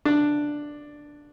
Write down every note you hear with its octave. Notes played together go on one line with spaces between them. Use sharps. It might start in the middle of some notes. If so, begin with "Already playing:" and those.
D4